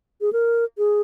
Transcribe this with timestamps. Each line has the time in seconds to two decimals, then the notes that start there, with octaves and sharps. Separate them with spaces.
0.21 G#4
0.33 A#4
0.78 G#4